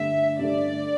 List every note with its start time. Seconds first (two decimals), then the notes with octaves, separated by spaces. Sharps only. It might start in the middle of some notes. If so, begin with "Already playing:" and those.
Already playing: G2 D3 A3 E5
0.39 G2 D3 A3 D5